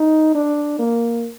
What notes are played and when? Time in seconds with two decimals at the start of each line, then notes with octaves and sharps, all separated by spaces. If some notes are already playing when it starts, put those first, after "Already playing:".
Already playing: D#4
0.35 D4
0.80 A#3